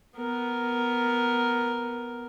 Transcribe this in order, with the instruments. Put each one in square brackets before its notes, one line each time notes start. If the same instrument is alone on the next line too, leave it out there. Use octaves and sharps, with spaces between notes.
[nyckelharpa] B3 A#4